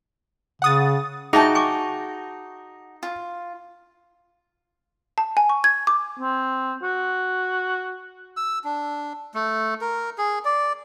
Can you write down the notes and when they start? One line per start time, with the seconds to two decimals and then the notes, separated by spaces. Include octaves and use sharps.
0.62 C#3 F#5 D#6 A6
1.33 D#4 F#4 G#4 E5 G5 A5
1.55 G#5 C#6 D6
3.03 F4
5.18 A5
5.37 G#5
5.49 C#6
5.64 G#6
5.87 D6
6.20 C4
6.83 F#4
8.37 E6
8.64 D4
9.34 A3
9.81 A#4
10.18 G#4
10.45 D5